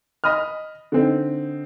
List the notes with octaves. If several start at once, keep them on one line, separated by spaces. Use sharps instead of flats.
D#5 B5 D#6 F6
D3 C4 D#4